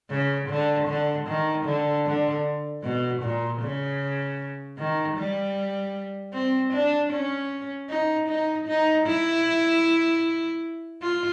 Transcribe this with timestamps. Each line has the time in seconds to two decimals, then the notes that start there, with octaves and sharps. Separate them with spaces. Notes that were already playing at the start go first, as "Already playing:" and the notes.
0.10 C#3
0.49 D3
0.88 D3
1.28 D#3
1.66 D3
2.06 D3
2.83 B2
3.23 A#2
3.62 C#3
4.78 D#3
5.17 G3
6.34 C4
6.73 D4
7.13 C#4
7.89 D#4
8.29 D#4
8.68 D#4
9.06 E4
11.02 F4